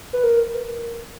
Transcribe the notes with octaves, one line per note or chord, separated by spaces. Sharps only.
B4
A#4